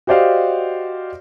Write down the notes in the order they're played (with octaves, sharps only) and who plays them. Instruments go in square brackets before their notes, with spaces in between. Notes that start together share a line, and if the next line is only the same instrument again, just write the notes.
[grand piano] F#4 G4 C5 D5 D#5 F5